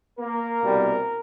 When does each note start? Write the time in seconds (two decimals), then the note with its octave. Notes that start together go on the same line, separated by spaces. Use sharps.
0.18 A#3 A#4
0.61 C2 B2 G3 A#3